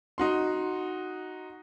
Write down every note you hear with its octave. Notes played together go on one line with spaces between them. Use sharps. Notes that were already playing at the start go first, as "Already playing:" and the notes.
D#4 F#4 C6